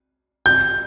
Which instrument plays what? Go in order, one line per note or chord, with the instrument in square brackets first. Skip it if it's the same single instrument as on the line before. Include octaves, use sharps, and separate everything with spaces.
[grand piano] G6